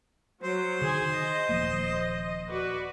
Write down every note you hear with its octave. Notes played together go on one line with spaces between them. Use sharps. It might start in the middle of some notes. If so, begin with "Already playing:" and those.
F#3 C5
D3 D#3 G#4 G#5 C6
D#5
D#1 F3 A#3
F#4 B4 D5